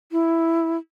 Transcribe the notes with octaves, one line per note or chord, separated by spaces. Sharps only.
E4